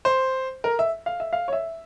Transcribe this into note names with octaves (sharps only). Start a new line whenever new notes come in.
C5
A#4
E5
F5
E5
F5
C#5
E5